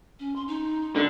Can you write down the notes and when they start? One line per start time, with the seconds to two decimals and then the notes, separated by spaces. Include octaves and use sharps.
0.20 C#4
0.36 C6
0.48 D#4
0.96 D3